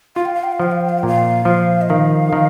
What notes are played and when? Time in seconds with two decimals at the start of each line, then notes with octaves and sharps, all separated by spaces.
0.16 F4 F5
0.25 G5
0.34 F5
0.44 G5
0.52 F5
0.60 F3 G5
0.71 F5
0.81 G5
0.89 F5
0.99 G5
1.03 A#2 F5
1.45 F3
1.81 D#5
1.89 D#3 F5
2.33 D#3